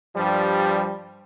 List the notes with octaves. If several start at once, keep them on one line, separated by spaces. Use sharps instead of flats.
G2 F3 G3